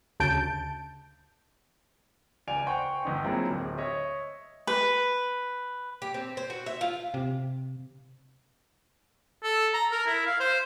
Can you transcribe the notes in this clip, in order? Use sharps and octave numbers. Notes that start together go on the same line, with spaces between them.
D2 C#3 A5 G6 D7
C#2 D5 F5 G#5 D7 F7
C5 F#5 G5 C6 C#6
G1 D#4 G5
F#3 G#3 A#3 C4 E4 F4
D1
C#5 D#5 E5
B4
G4
C4
C5
F#4
E5
F4
C3
A4
A#5
A#4
E4
F5
C5